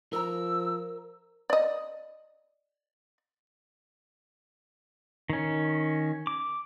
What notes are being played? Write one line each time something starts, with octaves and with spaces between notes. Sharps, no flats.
F3 A#4 A#5 E6
D5 D#5
D#3 C#4
D6